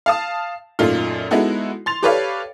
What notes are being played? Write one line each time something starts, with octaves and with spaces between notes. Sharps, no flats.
F5 A5 D#6
F#2 A#2 A3 D#4 F4
G#3 B3 D#4 E4 F#4 A4
C6 A6 F7
G4 A4 B4 C#5 D5 F5